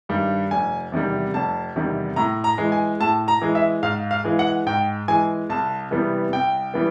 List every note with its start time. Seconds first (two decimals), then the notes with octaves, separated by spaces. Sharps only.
0.09 G2 D#3 G3
0.51 F1 G#5
0.92 E2 C3 D#3 G3
1.34 F1 A5
1.76 E2 C3 D#3 G3
2.16 A2 A#5
2.44 A#5
2.58 E3 G#3
2.72 G#5
3.00 A2 A5
3.28 A#5
3.42 E3 G#3
3.55 E5
3.83 G#2 F5
4.11 F5
4.24 E3 G#3
4.39 F#5
4.66 G#2 G5
5.08 E3 G#3 G#5
5.50 C2 A5
5.91 C3 E3 G3 B3
6.32 C2 G5
6.74 E3 G3 B3